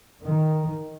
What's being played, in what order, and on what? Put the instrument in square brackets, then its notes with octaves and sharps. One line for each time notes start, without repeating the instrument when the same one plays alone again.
[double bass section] D#3